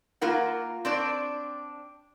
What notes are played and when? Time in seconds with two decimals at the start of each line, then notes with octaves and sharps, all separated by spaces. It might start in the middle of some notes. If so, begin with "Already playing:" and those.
0.21 A#3 F4 A#4 F#5
0.85 C4 D4 D5